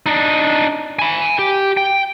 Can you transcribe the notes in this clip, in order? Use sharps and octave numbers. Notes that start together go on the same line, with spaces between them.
D4 D#4
G#5 B5
G4
G5